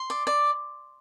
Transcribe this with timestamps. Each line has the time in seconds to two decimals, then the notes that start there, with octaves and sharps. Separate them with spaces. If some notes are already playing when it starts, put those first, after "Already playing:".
Already playing: C6
0.10 D5
0.27 D5